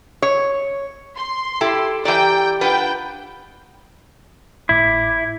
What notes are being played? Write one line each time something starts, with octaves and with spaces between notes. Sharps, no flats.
C#5
C6
E4 G4 A4
E3 G4 D5 G5 A#5
D4 F4 B4 F#5 G5
G#1 A2 E4 D6